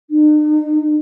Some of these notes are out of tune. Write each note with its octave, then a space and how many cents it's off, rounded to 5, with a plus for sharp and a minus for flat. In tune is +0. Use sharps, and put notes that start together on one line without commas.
D#4 -45